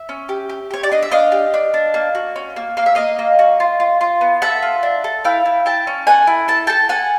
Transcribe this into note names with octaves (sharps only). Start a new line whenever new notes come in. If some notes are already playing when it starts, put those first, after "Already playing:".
Already playing: E5
C#4
G4
G4
G4 C#5
D5
D4 D#5
E5
D4 D#5 F5
G4
D4
D4
A#3
F#4
C#4
A#3
A#3 F5
E5
A#3 D#5 F5
A#3
F#4
F4
F4
F4
B3
A4 E5 F#5
F4
D4
A4
E4 F5 G5
E4
E4 G5 A5
C#4
A4 F#5 G#5
E4
A4 A5
A4 G5 A5
A4 F#5 G#5